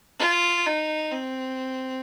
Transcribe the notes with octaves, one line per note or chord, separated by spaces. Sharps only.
F4
D#4
C4